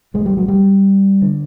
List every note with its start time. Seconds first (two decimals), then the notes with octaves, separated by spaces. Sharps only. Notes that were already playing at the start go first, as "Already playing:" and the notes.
0.14 A1 A2 G#3
0.26 G3
0.37 F#3
0.48 G3
1.22 D3